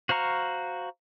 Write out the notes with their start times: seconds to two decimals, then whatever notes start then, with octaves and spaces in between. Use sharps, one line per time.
0.09 F#4 C5 F5 A#5 C#6